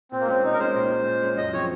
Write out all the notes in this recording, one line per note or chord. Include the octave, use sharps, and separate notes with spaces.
A#2 C4
A#3
G#3 C4 C#4
A#2 D#4
A#4
G#3 C#4 C5
A#2
G#3 C#4
A#2
G#3 C#4
F#2 D#5
F3 C4 C#5